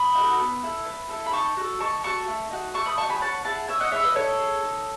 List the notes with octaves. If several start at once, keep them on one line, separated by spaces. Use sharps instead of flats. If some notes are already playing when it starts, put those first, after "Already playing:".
Already playing: B5 D#6
D#4 F#4 A4
B3
E4 A4
B3
E4 A4
B5
D#4 A5 C#6
F#4 A4
D#4 A5 C#6
F#4 A4 A5 C#6
A3
D#4 F#4
A3 A5 C#6
B5 D#6
D#4 F#4 A5 C#6
G#5 B5
C#4 F#5 A5
E4 G#4 F#5 A5
C#4 E5 G#5
D#5 F#5
E4 G#4 C#5 E5
B4 D#5
D#4 A4 C#5
G#4
D#4